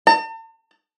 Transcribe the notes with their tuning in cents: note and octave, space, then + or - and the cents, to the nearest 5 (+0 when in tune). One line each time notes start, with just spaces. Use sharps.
A5 +45